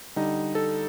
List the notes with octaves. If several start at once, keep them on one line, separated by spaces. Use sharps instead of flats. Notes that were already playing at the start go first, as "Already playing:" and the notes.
D3 G3 D#4
A4